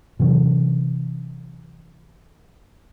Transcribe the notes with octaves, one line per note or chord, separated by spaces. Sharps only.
C3 E3 F#3 C#4